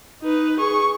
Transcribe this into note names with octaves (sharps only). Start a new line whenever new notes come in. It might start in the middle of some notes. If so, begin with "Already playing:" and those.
D#4 B4
G#4 C#6